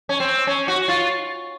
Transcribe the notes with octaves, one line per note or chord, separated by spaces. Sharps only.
C#4
C4
C#4
F#4
F4